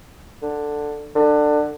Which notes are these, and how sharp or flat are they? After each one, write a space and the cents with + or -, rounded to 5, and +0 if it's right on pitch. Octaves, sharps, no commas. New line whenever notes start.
D3 +5
D3 +20